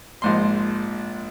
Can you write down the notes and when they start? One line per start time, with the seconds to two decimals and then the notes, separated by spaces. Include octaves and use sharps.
0.22 A#1 G#2 C6